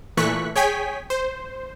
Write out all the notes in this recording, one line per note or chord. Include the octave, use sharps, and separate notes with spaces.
A#2 E3 A3 C#6 F#6 B6
G#4 C#5 G5 G#5 B6
C5